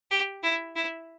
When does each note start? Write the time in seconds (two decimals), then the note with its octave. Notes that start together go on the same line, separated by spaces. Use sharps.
0.11 G4
0.43 E4
0.76 E4